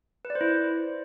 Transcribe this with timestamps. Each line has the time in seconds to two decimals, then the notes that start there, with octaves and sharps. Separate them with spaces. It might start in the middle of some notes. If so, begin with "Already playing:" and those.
0.25 B4
0.30 D5
0.35 C5
0.41 E4